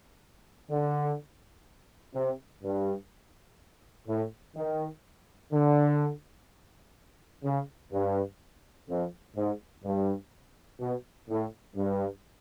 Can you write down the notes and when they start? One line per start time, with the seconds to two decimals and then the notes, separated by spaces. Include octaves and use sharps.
0.71 D3
2.15 C3
2.63 G2
4.08 A2
4.56 D#3
5.52 D3
7.44 C#3
7.92 G2
8.89 F2
9.36 G#2
9.85 G2
10.80 B2
11.29 A2
11.76 G2